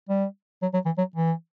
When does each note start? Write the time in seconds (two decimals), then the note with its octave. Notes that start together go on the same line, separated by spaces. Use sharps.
0.09 G3
0.62 F#3
0.73 F#3
0.85 E3
0.98 F#3
1.16 E3